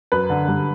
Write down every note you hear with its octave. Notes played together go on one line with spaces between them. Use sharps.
F#2 B4
D3
G2